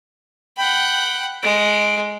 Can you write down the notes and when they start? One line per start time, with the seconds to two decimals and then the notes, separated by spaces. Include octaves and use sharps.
0.57 F#5 G5 B5
1.43 G#3 D7